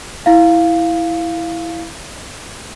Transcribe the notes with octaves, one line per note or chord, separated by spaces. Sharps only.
E4 F5